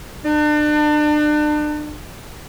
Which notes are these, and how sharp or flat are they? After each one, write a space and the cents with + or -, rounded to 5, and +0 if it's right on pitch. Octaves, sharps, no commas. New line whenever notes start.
D4 +35